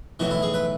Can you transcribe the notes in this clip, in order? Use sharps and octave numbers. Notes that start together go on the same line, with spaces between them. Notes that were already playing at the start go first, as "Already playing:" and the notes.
B1 A2 E3 F#4
E4
G#4
B4